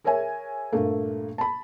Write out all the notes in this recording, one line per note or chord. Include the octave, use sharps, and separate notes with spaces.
G#4 A#4 C#5 E5 G#5
G2 A#2 A3 A#3
A5 B5